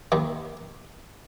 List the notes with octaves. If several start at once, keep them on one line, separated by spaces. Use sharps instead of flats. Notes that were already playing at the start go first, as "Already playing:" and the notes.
D#2 D#3